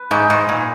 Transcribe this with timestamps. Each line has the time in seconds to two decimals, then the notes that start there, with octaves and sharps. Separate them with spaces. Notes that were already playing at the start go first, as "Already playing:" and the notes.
Already playing: B4
0.11 G#2 D#4
0.30 G#2
0.49 A#2